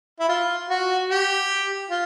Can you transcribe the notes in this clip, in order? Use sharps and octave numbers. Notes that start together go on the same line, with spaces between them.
E4
F4
F#4
G4
F4